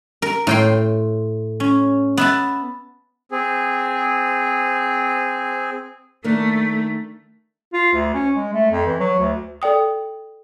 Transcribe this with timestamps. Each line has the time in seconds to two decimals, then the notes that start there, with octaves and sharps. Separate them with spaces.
0.22 A#4
0.47 A2 G5 C6
1.60 C#4
2.17 B3 E5 A5
3.32 C4 G#4
6.24 D#3 A3 A#3 D4
7.73 F4
7.93 D2
8.14 C#4
8.35 G#3
8.53 A3
8.71 F2
8.86 E3
9.00 F#3
9.19 D2
9.62 A4 D5 G5 D#6